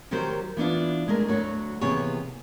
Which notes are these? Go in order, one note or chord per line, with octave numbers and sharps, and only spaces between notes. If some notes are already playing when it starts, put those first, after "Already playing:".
D#3 F#3 G4 A#4 C5
E3 B3 D4 F4
G#3 A3 G#4 A#4
D2 F#3 G#3 F#4 C#5
D#2 C3 E3 B3 G#4 C#5